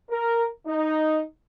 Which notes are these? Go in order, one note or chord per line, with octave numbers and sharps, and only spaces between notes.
A#4
D#4